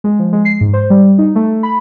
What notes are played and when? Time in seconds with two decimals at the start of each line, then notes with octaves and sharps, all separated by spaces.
0.04 G#3
0.19 F3
0.33 G#3
0.45 C7
0.61 G#2
0.73 C5
0.90 G3
1.18 D#4
1.35 A3
1.63 B5